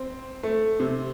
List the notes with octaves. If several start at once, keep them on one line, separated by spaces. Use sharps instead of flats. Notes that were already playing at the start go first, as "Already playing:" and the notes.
Already playing: C4
A3
C3